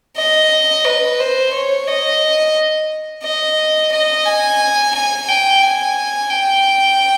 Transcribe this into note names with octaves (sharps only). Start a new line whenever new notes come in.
D#5
B4
C5
C#5
D#5
D#5
D#5
G#5
G#5
G5
G#5
G5